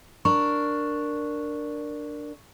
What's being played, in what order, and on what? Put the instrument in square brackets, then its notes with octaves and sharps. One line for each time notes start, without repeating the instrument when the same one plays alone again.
[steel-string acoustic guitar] D4 A#4 [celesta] C#6